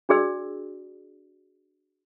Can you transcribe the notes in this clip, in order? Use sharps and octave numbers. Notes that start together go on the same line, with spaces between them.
D4 F#4 G#4 D5 E6